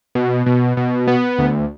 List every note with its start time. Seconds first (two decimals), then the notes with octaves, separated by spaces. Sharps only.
0.15 B2
0.46 B2
0.77 B2
1.07 B3
1.39 D2